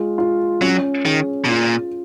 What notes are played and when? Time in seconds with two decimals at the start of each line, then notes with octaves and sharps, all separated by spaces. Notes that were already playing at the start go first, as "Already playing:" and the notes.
Already playing: G#3 F4
0.18 F4
0.61 F#3 C#4
1.05 D#3 G#4
1.45 B2
1.49 A#2 F4